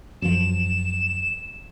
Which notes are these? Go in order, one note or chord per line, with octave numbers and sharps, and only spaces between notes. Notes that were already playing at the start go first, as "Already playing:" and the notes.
F#2 F3 E7